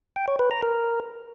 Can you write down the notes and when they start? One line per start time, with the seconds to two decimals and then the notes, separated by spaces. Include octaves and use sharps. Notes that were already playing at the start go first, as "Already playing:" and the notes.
0.16 G5
0.28 C#5
0.39 B4
0.51 A#5
0.62 A#4